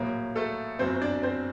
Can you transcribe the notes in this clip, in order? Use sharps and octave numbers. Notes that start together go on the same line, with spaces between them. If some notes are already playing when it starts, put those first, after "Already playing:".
Already playing: A#1 A2 F#3 A#3
A3 A4
G1 F#2 F#3 C4 C5
C5
D4 D5
C4 C5